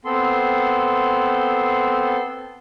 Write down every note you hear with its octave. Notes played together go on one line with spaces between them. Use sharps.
B3 C4 A4 C6